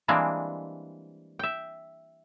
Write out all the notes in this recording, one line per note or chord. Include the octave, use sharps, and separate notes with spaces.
E3 G3 G#3 A#3 C4 D4
E5 G5